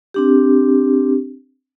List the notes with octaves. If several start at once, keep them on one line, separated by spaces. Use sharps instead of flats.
C4 D4 G4